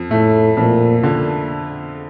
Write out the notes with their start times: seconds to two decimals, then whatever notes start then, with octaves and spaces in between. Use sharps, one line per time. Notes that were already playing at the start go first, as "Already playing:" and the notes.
Already playing: F2
0.10 A2 A3
0.57 F2 A#2
1.03 D3